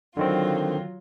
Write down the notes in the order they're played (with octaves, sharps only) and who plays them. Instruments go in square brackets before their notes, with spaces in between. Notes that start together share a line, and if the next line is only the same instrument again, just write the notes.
[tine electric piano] D3 D#3 C4 [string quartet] F#3 F4